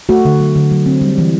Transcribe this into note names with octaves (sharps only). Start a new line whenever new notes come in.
A3 F#4
D3
F#3
D3
F#3
C4
G3
E3